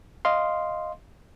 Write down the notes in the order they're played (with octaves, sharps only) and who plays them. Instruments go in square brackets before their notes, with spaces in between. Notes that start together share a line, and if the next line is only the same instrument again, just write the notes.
[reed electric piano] D#5 F5 C6